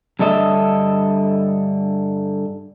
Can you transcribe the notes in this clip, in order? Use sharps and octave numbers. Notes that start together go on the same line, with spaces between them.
G2 D3 A4 D#5 E5